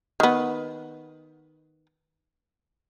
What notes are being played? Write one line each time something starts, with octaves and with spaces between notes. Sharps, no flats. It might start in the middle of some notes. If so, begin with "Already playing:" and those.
D#3 B3